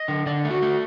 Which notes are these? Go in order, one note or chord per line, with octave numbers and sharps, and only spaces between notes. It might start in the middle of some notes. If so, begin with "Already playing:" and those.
Already playing: D#5
D3
D3 D5
A3
F#4
A3